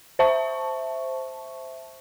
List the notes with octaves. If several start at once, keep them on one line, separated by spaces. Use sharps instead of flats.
C5 E5 A5 C#6